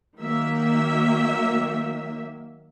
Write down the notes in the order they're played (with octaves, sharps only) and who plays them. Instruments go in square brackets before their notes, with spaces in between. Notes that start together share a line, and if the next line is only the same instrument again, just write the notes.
[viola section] D#3 F#3 A#3 E5